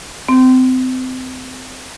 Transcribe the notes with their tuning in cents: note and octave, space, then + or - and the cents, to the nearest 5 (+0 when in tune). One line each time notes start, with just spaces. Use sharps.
C4 -30